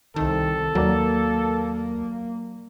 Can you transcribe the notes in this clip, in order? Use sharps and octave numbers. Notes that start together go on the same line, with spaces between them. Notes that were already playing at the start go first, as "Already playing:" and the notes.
C2 D#3 A4
D#2 F#3 A#3 A#4 D5